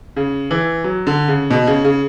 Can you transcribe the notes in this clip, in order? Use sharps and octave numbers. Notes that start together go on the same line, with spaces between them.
C#3
E3
F#3
D3
C#3
B2
C#3
C#3